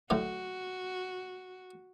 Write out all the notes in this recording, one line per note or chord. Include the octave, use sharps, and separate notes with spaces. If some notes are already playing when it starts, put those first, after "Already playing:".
A2 D3 F#3 F#4